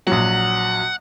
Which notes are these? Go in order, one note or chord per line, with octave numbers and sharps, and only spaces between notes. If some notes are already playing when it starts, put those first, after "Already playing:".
A#1 F#3 F#5